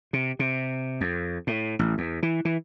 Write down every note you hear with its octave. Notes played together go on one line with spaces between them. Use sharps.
C3
C3
F2
A2
A1
E2
E3
E3